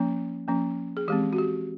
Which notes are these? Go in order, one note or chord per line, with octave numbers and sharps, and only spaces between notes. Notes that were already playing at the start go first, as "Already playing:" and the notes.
Already playing: F3 A#3 C#4
F3 A#3 C#4
G#4
E3 G#3 C4 G4
F#4
G4